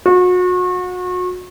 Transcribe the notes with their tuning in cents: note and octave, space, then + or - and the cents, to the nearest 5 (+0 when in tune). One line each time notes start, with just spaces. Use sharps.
F#4 -35